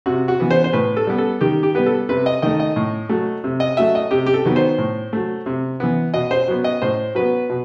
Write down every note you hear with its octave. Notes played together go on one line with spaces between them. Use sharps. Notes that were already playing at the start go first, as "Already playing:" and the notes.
C3 F#4
F#4
E3 B3
C5
C5
A2 B4
A4
G3 B3
A4
D#3 G4
G4
G3 B3 B4
A4
C3 B4
D#5
D#3 A3 D#5
D#5
A2
F#3 A3
C3
D#5
F#3 A3 E5
D#5
C3 G4
G4
A4
D#3 F#3 B3
C5
A2
F#3 A3
C3
E3 B3
B2 D#5
C5
F#3 B3
D#5
A2 C5
F#3 B3 B4
B2